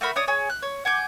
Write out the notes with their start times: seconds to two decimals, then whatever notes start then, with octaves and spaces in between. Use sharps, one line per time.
0.01 A3 F#4 A#4 B5
0.16 D4 C#5 D#6
0.28 G#4 C#5
0.50 F#6
0.62 C#5
0.85 F#5 G#5 D6 G6